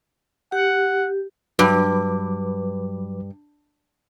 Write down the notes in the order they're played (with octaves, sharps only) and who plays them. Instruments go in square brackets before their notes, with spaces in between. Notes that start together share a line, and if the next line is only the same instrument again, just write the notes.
[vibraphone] G4 [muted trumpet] F#5
[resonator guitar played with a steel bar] G2 [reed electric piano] F#3 B4 D6